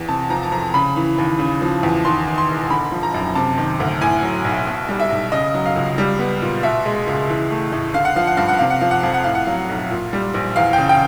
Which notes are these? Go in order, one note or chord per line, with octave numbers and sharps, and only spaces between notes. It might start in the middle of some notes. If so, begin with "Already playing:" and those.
Already playing: E2
C3 A5
F3 A#5
A5
F2 A#5
C#3 B5
E3
D#2
C#3
F3
E2
D#2 C6
D#3
C6
E1
D3 B5
F3
A#5
F#2
C3 A5
D#3
D2
A2 G#5
F#3
B1
B2
G3
E5
B1
C#3 D#5
F#3
F5
C#2
G3
B3
A#2
B2 E5
G#3
C#2
E3
A3
A2
D3 F5
F#5
F3 F5
F#5
G2 F5
F#5
C3 F5
F#5
F3 F5
F#5
F2 F5
F#5
A2 F5
F#5
F#3 F5
B1
A#2
G3
A#1
E2 F5
G5
C#3
G5